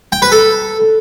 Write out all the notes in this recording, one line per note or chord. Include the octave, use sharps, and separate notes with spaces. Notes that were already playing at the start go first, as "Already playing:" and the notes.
G5
B4
A4